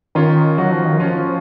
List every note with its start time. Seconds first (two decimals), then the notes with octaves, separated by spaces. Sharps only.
0.15 D#3 C#4 F4
0.58 F#3 D#4 F#4
0.71 F3
0.85 D#3
0.98 F3 C#4 F4